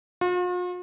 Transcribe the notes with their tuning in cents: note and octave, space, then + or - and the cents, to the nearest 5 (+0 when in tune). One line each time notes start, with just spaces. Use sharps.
F4 +45